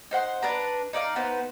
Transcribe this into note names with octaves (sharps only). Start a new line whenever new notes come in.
D#4 C5 F#5 C6
D4 B4 A#5
D#4 D5 E5 F5
B3 D#4 B4 C5